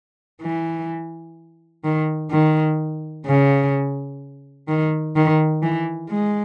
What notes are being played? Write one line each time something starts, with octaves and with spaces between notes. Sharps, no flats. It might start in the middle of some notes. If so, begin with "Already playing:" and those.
E3
D#3
D#3
C#3
D#3
D#3
E3
G#3